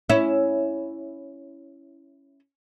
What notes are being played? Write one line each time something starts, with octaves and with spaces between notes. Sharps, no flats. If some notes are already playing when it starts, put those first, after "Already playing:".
C#4 E4